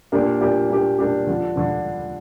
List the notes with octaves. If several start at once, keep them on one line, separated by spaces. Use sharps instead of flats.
A#2 A#3 D4 G4
A#2 A#3 D4 G4
A#2 A#3 D4 G4
A#2 A#3 D4 G4
D3 F3 D4
D3 F3 D4